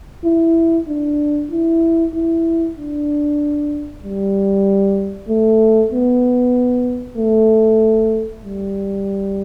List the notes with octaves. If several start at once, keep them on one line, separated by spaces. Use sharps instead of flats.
E4
D4
E4
E4
D4
G3
A3
B3
A3
G3